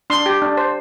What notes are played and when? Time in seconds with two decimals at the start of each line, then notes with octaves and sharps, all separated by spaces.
0.10 D4 C6
0.26 G4
0.42 D4
0.57 C5